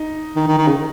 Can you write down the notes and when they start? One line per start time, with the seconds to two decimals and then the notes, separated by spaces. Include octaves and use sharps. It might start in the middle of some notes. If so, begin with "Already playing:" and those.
Already playing: D#4
0.36 D#3
0.47 D#3
0.58 D#3
0.68 C#3